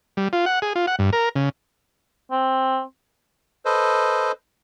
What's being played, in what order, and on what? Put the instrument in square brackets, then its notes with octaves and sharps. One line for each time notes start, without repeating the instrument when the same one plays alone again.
[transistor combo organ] G3
F4
F#5
G#4
F4
F#5
G2
A#4
C#3
[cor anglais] C4
[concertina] A4 B4 C5 D#5